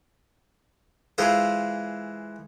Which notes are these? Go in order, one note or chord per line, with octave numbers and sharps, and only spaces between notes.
E3 G#3 F4 G#4 A4 C5